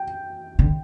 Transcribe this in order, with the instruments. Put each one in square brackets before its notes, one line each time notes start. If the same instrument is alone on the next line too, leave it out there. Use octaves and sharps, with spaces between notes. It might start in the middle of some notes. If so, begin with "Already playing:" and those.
Already playing: [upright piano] G5
[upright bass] D3